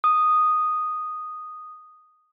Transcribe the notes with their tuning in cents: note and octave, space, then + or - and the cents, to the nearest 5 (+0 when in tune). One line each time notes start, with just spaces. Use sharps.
D#6 -5